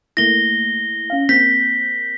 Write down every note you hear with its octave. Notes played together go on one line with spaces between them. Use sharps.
A3 A#3 E4 A#6 G7
C#4 F5
A#3 C4 G6 B6